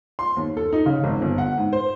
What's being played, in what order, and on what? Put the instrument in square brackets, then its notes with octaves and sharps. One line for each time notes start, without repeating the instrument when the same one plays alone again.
[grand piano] C6
D#2
A4
D#4
C#3
G#1
G1
F#5
G#2
C5